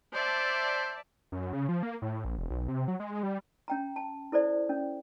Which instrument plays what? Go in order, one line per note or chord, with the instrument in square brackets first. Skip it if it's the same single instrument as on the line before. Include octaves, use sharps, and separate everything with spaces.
[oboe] C5 [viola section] D5 E5 A5
[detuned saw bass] F#2
C#3
F3
A#3
A2
A#1
E1
B1
C3
F#3
G#3
G3
[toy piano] C#4 G5 A#5
A5
E4 A4 C5 D5
C#4